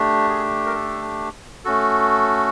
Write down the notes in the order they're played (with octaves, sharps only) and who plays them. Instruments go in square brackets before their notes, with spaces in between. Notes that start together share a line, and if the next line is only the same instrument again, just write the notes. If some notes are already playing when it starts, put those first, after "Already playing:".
Already playing: [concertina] A3 D4 G4
G#4
A#4
A4
A3 C#4 F#4 A4